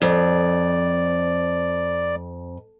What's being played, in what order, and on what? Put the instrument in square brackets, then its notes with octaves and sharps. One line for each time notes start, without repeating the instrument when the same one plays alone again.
[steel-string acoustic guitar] F2 [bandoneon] D5